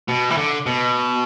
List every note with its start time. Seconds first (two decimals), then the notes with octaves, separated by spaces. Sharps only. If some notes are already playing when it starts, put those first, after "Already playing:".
0.09 B2
0.30 E3
0.37 D3
0.66 B2